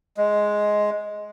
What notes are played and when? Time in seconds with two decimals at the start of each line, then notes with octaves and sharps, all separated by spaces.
0.18 G#3